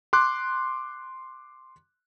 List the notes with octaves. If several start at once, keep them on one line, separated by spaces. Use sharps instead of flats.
C6 D6 F#6